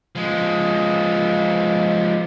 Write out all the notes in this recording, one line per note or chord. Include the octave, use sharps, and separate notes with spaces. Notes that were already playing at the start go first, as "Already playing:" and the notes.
F3 G#3